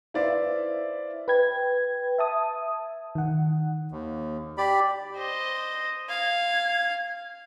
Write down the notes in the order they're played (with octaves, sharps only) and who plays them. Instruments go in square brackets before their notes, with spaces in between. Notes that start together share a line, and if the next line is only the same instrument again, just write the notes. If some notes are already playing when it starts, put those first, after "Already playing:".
[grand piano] E4 B4 C5 D5 E5 F5
[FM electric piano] B4 G5 G#6
E5 A5 D#6
D#3 F#5
[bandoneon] D#2
G4 D5 B5
[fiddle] C5 D#5
[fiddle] F5 [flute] G#6